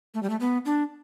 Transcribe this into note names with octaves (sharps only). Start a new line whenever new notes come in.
A3
G3
A3
B3
D4